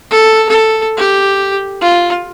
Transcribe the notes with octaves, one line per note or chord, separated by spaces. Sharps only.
A4
A4
G4
F4